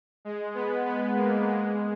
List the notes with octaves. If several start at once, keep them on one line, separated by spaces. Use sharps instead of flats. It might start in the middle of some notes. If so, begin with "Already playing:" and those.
G#3
B3
B3
A#3
G#3